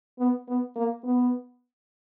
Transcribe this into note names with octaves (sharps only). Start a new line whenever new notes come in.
B3
B3
A#3
B3